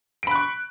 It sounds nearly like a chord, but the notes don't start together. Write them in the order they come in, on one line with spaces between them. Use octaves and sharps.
D7 B5 F#6 C#6